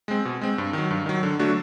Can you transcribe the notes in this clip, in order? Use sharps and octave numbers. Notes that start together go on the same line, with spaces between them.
G#3 C4
B2
G#3 C4
G2
D#3 F#3
G2
D#3 F#3
D3
F#3 A3 D4 F#4